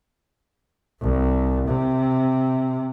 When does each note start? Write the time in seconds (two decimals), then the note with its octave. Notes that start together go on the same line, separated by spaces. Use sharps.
1.01 C2
1.67 C3